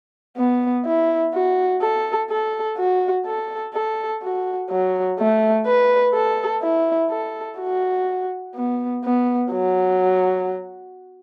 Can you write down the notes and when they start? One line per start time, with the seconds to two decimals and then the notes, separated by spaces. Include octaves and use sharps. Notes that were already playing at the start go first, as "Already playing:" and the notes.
0.37 B3
0.85 E4
1.34 F#4
1.81 A4
2.30 A4
2.77 F#4
3.26 A4
3.74 A4
4.22 F#4
4.70 F#3
5.19 A3
5.66 B4
6.14 A4
6.62 E4
7.10 A4
7.59 F#4
8.56 B3
9.04 B3
9.51 F#3